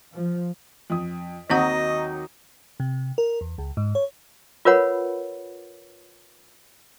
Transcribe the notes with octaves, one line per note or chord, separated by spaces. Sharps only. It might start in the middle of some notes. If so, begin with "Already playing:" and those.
F3
F2 D#6
D#2 D#3 F#3 C4 D#4 D#5 F#5
C3
A#4
E2
C#2
G#2
C#5
F4 A#4 B4 C#5 F#5 B5